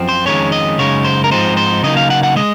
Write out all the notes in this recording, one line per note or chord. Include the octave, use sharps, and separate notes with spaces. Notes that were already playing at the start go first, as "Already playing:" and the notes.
Already playing: F#2 F3 C4
C5
F2 D#3 G#3 C#4 C#5
D#5
F#2 C#3 G#3 D#4 C#5
C5
A#4
G#2 F3 G#3 C4 D#4 C5
C5
C#3 F#3 A#3 D#4 D#5
F5
F#5
F#5
C#3 G#3 D#5